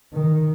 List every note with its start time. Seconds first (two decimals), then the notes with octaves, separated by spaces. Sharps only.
0.13 D#3